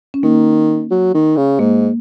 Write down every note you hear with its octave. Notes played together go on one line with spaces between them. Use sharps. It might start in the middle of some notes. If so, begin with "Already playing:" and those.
C#4
D#3 A#3
F#3
D#3
C#3
G#2 A#3